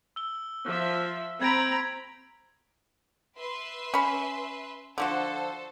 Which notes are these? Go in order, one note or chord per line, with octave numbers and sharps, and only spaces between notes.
E6 G7
F3 E5
C4 A#5 B5 G#6 D7
B4 E5 C6
C#4 B5
D3 F3 F#4 A4 C5